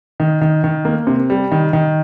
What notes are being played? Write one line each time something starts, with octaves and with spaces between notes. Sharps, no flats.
D#3
D#3
D#3
A#3
C3
G3
D#3
D#3